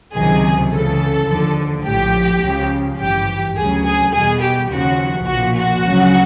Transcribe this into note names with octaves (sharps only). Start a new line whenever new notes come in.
C#2 C3 D#3 F#3 G#4
C#2 C#3 E3 A4
D#2 D3 F3
A#1 A2 F3 G4
C#2 C#3 F3
G#1 G2 E3 G4
D2 C#3 F#3 G#4
G#4
E2 B2 G3 G#4
G4
D#2 C#3 F3 F#4
B1 A#2 F3 F#4
F#4
D2 C#3 F#3